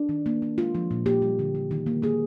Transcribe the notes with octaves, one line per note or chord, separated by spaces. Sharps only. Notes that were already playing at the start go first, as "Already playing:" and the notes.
Already playing: D4
D#3
A#3
A#3
G#3 F4
F3
A#2
A#3 G4
G3
D3
G3
D#3
A#3
A#3 G#4